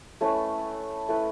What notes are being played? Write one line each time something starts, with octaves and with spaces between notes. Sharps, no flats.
A3 C#4 E4 B4
A3 E4 B4